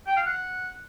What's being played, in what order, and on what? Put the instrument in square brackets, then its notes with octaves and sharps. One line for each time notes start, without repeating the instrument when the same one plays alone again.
[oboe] G5
F5
F#5